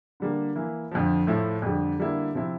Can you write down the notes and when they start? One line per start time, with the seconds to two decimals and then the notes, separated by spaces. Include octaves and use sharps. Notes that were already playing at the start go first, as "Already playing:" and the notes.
0.20 D3 G3 A#3
0.55 E3 A#3 E4
0.91 F2 D3 F3
1.27 A2 F3 A3 E4
1.62 F2 D3 G3
1.99 D3 G3 A#3 E4
2.34 C3 F3 C4 E4